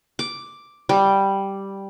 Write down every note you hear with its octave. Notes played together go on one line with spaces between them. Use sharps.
D6
G3